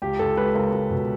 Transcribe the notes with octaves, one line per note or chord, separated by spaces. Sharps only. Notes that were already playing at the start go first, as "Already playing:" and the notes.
C#2 G4
C#2 A4
G#3 B4
C#2 A#4
C#2
B2